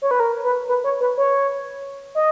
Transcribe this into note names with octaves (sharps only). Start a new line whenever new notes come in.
C#5
B4
A#4
B4
B4
C#5
B4
C#5
D#5